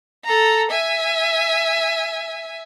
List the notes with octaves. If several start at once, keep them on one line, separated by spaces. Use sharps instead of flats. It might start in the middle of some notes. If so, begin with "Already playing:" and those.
A4 A#5
E5 G#5